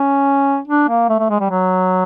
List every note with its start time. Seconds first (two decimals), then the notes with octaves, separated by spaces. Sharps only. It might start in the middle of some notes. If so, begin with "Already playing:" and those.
Already playing: C#4
0.68 D4
0.88 A#3
1.09 A3
1.19 A3
1.30 G#3
1.40 G3
1.50 F#3